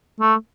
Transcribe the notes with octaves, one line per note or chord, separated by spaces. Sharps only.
A3